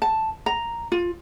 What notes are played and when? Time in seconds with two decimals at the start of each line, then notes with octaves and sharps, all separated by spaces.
0.02 A5
0.46 A#5
0.92 F4